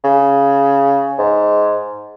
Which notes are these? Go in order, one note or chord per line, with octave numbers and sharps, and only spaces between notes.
C#3
G#2